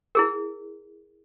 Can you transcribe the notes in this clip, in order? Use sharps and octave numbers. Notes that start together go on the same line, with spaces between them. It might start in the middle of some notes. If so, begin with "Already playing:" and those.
E4 G#4 A#4